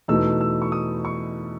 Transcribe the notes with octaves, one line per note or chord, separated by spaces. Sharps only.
E2 B2 A3 D#4 E6
E6
C#6
D#6
C#6